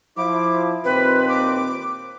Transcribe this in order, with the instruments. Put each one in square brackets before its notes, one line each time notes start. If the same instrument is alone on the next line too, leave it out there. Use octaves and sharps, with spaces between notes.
[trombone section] F3 E4 [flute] D6
[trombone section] D#2 A#2 C4 [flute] B4
[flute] D6